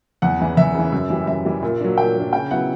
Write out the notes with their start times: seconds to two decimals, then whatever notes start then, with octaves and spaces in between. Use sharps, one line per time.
0.22 E2 F#5
0.39 C#3 E3
0.57 E2 E5
0.75 C#3 E3
0.92 F#2
1.10 E3 G3
1.27 F#2 E5
1.45 E3 G3
1.62 A#2
1.80 F#3 A#3 D4
1.98 A#2 G5
2.15 F#3 A#3 D4
2.33 C#3 G5
2.51 F#3 B3 E4 F#5